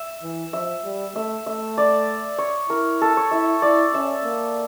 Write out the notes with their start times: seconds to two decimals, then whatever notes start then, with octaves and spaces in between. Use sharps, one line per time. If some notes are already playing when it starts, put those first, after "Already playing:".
Already playing: E5
0.23 E3
0.53 F3 E5
0.85 G3
1.15 A3 E5
1.46 A3 E5
1.78 D5
2.38 C#5
2.70 E4 A#4
3.01 A4
3.17 C#5
3.31 E4 E5
3.62 E4 D5
3.94 C#4 E5
4.25 A#3